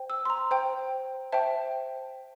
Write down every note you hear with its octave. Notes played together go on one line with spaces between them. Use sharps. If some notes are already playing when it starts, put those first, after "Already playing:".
Already playing: C5 G5
E6
C6
A#5
C5 G5
C5 E5 G5 A5